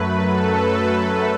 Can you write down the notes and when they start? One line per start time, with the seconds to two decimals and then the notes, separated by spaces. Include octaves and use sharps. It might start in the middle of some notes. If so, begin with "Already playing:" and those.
Already playing: F#2 F#3 A3 B4
0.30 A4
0.94 A4